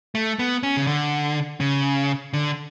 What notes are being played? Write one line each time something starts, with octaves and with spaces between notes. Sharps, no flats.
A3
B3
C#4
C#3
D3
C#3
D3